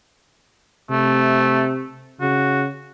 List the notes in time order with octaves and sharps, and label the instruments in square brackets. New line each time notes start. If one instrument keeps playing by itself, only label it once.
[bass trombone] C3 [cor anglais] A3
[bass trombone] C#3 [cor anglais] F#4